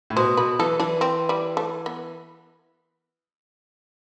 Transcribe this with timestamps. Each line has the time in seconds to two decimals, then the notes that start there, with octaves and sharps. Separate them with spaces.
0.10 A2
0.16 B2 C5
0.37 B2 B4
0.59 E3 A4
0.80 E3 D4
1.01 C4
1.29 G3
1.57 A3
1.86 B3